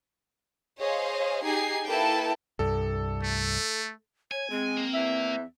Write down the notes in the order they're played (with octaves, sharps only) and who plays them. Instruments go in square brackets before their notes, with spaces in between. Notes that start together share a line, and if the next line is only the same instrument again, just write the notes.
[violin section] G#4 C5 C#5 D#5 F5
D#4 G4 G#4 G#6 C7
A#3 E4 A4 B4 G5 A5
[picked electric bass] C2 G2 [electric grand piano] A4
[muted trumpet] A3
[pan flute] C#5 [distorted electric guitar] G#5
[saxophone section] G#3 [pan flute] C4
[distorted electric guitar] A#3
[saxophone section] E2 E5